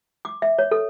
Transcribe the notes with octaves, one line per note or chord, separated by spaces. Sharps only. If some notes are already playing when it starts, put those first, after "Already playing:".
D6
E5
C#5
A4